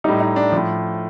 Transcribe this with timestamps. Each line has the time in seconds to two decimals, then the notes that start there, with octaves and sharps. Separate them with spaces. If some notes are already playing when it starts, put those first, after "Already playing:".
0.04 A2 G3 D#4
0.20 D#4
0.36 D4
0.52 A2 F3